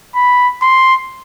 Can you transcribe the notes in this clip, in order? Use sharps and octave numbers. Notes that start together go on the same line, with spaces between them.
B5
C6